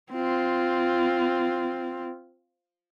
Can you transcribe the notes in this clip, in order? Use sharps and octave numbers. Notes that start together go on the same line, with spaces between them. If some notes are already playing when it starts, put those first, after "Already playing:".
C4 F4